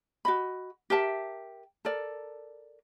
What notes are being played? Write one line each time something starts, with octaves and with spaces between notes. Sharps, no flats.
F#4 D#5 B5
G4 A#4 E5 A5
A4 A#4 D5